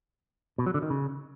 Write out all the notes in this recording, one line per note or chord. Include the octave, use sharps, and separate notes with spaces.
B2
F#3
D3
D#3
C#3